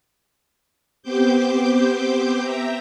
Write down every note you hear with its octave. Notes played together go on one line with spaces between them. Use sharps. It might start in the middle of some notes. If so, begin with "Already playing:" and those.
B3 C4 G4 C5 D6 G6
E5 G5 A#5